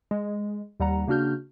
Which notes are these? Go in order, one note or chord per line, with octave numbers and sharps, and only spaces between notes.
G#3
D#2 G3 F#5 A#5
C#3 A#3 D4 F#4 F6 G6